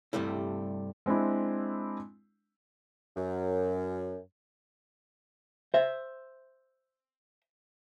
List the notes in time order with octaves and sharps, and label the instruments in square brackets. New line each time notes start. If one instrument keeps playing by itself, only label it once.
[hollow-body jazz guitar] G2 C3 G3 A3 E4
[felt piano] G#3 C4 D4 E4
[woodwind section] F#2
[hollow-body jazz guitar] C5 E5